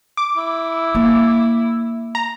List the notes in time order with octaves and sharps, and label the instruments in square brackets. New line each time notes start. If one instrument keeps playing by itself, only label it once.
[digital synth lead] D6
[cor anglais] E4
[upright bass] A#3
[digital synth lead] A#5